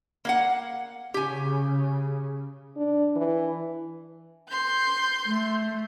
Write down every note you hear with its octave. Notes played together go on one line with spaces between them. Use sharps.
A#3 F5 F#5
C#3 G4 G#5
D4
E3
C6 G6
A3